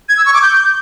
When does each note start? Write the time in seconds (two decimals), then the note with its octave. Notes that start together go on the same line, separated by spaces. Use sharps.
0.09 G#6
0.17 E6
0.26 C#6
0.34 D6
0.42 G6